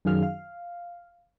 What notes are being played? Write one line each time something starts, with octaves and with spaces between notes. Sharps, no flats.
F#2 D#3 F#3 G#4 F5 F6
F5